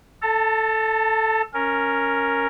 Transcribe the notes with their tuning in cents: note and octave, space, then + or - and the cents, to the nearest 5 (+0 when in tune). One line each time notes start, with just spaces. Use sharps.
A4 +0 A5 +35
C#4 +0 A#4 +0